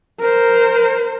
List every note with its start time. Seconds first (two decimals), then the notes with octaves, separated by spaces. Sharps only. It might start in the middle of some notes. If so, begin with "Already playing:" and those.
0.19 A#4 C5